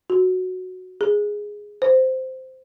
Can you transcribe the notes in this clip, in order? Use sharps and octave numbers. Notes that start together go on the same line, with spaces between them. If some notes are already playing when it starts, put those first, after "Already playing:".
F#4
G#4
C5